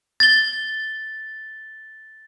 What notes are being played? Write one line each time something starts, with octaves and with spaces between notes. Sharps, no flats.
A6 G7